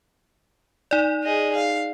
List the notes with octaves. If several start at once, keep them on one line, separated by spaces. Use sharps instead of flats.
D#4 D5
G#4 D#5
F5